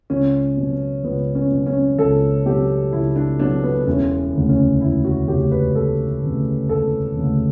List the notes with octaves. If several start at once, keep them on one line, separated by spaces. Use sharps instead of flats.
C#2 C#4
B2 F#3
C#2 B3
C#4
B2 F#3
C#4
C#2 A4
B2 F#3 G4
C#2 E4
D4
B2 F#3 D4
B3
E1 C#4
D2 C#3
C#4
E1 E4
F#4
D2 C#3 G4
B4
E1 A4
D2 C#3
E1 A4
D2 C#3